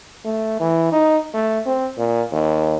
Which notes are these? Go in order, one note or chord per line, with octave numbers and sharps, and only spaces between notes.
A3
E3
D#4
A3
C4
A#2
D#2